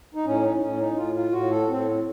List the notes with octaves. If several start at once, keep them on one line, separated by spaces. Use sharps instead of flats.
D#4
A2 C#4
D#4
D#4
A2 C#4
D#4
A2 F4
F4
A2 F#4
A4
A2 C4